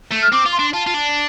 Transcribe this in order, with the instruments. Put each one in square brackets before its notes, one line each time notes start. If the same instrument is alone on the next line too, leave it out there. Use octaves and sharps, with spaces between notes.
[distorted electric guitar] A3
[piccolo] F6
[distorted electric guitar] C4 [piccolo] D6
[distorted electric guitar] F4
[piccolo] C6
[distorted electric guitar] D4
[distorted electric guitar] F4 [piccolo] A5
[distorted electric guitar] F4
D4